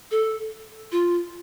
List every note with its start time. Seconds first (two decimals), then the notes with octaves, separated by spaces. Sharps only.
0.11 A4
0.92 F4